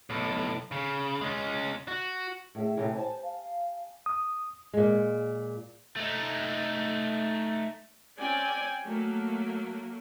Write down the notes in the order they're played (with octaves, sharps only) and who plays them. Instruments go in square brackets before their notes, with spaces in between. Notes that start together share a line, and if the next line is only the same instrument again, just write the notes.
[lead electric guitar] B1 A2
C#3
G#3 C#4
F#4
[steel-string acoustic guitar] A2 E5 [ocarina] G#4
[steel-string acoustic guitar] A2 C3 E3
[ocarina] C5 [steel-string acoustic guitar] G#5 A5
[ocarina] F5
[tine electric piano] D#6
[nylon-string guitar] A#2 G#3
[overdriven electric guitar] A3 D#4
[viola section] C4 C#4 D5 G5 G#5
F#3 A3 A#3